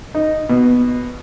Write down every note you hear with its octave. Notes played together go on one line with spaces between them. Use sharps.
D#4
B2